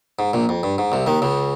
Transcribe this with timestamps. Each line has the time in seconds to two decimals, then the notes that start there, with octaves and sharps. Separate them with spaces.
0.19 G#2
0.33 A#1 A#2
0.49 F2
0.63 G2
0.78 G#2
0.92 C2 C3
1.06 D#2 D#3
1.22 C#2 C#3